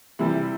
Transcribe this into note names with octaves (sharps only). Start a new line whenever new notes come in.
C3 E3 G3 E4